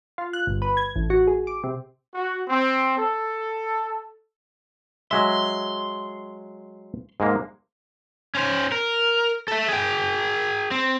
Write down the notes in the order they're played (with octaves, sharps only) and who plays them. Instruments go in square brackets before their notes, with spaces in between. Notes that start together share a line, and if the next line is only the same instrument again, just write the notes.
[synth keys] F4
F#6
G1
B4
G#6
A1
F#4
G#4
D6
C3
[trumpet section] F#4
C4
A4
[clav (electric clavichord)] F#3 G#3 E5 [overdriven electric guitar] C6
[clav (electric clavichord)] G#2 G#3 A#3
[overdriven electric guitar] C#4 C5
A#4
A4 E5
G#4 G5
C4